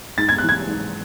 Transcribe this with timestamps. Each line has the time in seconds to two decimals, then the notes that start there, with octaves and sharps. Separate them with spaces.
0.18 G#2 A6
0.29 G#6
0.38 E3 F#6
0.49 G#6
0.67 G#2